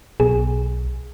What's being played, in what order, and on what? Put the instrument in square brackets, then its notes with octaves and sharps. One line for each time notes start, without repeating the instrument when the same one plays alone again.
[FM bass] B1 [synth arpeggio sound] G#4